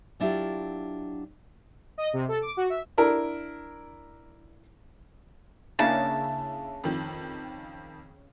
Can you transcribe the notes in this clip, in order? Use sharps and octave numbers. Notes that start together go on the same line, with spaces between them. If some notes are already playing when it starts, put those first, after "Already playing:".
F#3 D4 E4 F4 G4
D#5
C3
A4
D6
F#4
E5
D4 E4 A#4
C#3 A#3 D4 E4 A5
F2 D#3